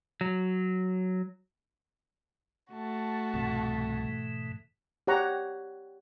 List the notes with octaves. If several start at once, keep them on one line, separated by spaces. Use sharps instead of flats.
F#3
A3 F#4 A5
C2 G#2 B2 E3
G4 C#5 F#5 A#5